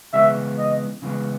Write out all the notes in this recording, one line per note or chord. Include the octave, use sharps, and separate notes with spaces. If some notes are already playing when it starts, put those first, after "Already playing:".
C#3 E3 G#3 B3 E5
D#5
C#3 E3 G#3 B3